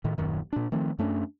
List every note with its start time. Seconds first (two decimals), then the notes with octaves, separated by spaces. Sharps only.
0.04 A2 D#3
0.18 D#1 F#2 D#3
0.53 A#2 D4
0.72 D#3 F3 A3 C4
0.99 F#2 A3 C#4 D4